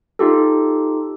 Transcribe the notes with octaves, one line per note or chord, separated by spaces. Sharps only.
D#4 F4 G4 A4